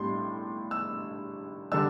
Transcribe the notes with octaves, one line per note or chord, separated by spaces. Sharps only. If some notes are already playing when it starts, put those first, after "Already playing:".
Already playing: B1 A2 G3 D4 C6
E6
D3 G3 D4 E6